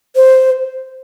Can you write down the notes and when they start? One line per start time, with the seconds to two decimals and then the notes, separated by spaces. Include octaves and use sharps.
0.16 C5